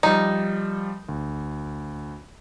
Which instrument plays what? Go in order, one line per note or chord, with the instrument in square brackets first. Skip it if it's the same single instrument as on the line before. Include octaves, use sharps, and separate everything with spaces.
[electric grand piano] F3 G3 [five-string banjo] D#4
[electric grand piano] D2